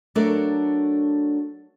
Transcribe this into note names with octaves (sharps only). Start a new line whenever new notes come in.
F#3 A3 D4 A4 A#4 D5